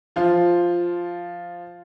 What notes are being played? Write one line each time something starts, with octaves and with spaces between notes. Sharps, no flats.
F3 F4